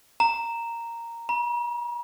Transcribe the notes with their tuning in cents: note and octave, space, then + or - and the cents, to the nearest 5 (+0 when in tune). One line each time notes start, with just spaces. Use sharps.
A#5 -5
A#5 +45